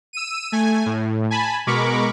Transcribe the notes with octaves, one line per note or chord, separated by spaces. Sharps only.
E6 D#7
A3 G#5
A2
G#5 A5 B5
B2 G#3 A#4 B5 C#6 D6